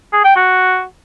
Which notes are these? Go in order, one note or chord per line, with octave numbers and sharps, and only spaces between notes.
G#4
G5
F#4